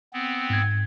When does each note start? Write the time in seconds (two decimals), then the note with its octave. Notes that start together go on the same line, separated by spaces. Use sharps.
0.13 B3 C4
0.50 G#2 G#6